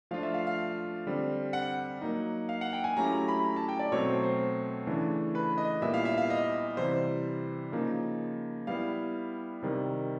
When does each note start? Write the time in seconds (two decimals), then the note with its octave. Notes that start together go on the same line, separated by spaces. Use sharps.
0.11 F3 A3 D4 F4 F5
0.23 E5
0.34 F5
0.47 F5
1.07 D3 G3 C4
1.53 F#5
2.02 F#3 A#3 D#4
2.49 F5
2.61 F#5
2.73 G5
2.84 G#5
2.97 F#3 A3 C#4 E4 G4 A#5
3.13 A#5
3.28 B5
3.44 A#5
3.56 A5
3.69 G5
3.79 D5
3.92 B2 F#3 A3 C4 C#5
4.08 C5
4.24 C5
4.87 C#3 E3 A3 D4
5.35 B4
5.58 D#5
5.82 A#2 G3 B3 E4 E5
5.94 F5
6.05 E5
6.18 F5
6.30 D#5
6.77 C3 E3 G3 C5
7.72 C#3 F3 A#3 D#4
8.67 G3 B3 E4 F5
9.62 C3 D#3 G3